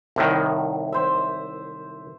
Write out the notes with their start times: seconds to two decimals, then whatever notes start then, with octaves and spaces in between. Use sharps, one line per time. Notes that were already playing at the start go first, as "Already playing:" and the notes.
0.16 C2 A2 D#3
0.92 C5 E5